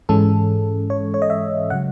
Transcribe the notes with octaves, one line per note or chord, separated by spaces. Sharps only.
G#2 E3 G#3 C#4 A4
C#5
C#5
D#5
E5
C#3 F#3 F#5